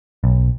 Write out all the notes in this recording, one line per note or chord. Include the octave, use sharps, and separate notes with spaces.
B1